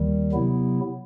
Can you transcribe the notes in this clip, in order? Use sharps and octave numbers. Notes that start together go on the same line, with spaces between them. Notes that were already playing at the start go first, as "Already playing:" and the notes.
Already playing: D#2 D#3 G3
C3 F#3 B3 E4